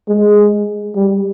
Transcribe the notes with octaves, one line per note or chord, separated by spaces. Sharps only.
G#3
G3